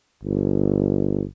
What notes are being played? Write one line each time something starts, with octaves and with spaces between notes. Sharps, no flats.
G1